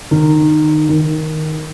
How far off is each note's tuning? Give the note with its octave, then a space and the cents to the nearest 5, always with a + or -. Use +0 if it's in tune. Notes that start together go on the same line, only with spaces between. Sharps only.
D#3 -20
D#3 +5